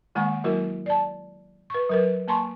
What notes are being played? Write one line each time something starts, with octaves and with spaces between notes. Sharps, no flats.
D#3 G#3 A#3 F#5 A#5 C#6
F#3 A#3 E4 F#4 A#4
D5 A5
B4 C#6
F#3 A#4 B4
A#3 A5 A#5 C6 C#6